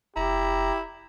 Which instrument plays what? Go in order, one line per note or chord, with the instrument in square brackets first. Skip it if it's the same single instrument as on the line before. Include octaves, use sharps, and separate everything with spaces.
[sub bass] F1 [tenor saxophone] E4 [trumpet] G4 [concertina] A#5